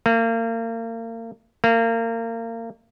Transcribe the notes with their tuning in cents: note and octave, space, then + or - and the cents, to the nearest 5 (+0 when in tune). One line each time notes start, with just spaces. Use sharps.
A#3 -35
A#3 -30